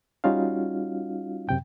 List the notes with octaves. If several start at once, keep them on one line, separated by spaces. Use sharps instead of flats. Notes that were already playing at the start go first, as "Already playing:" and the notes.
G3 C#4 D#4 F4 F#4 F5
F#2 C3 G5